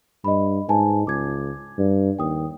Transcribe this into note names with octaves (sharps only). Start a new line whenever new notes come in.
G2 D#5 B5
G#2 B4 G#5 A5
C#2 D6 G#6
G2
D#2 G5 D#6